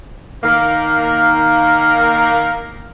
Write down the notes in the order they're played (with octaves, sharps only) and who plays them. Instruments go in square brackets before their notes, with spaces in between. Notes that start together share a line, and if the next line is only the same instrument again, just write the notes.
[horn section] D#3 A#3 A#4